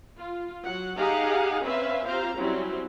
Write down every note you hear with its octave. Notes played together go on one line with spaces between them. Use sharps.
F4
F#3 F#5
D#4 G4 G#4 F5 F#5 A#5
C4 C#4 B4 E5 F5
C4 F4 G4 C5 F5 A#5
F#3 G3 C4 C#4 E4